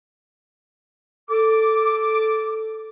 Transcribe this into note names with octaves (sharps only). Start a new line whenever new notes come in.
A4 D6